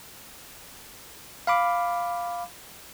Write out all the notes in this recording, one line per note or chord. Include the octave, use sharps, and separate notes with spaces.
F5 B5 D6